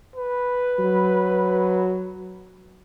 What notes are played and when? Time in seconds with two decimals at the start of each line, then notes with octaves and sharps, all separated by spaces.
0.16 B4
0.79 F#3